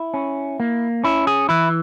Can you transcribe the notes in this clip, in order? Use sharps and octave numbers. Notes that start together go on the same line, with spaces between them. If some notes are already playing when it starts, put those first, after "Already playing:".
Already playing: E4
C#4
A#3
C#4 E4
G#4
E3 E4